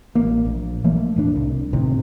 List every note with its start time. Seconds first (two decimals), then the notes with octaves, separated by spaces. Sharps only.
0.15 A1 A#3
0.45 A#1
0.84 E3 F3 A3 A#3
1.16 E1 A2 D4
1.35 C2
1.73 G1 A2 C3 D#3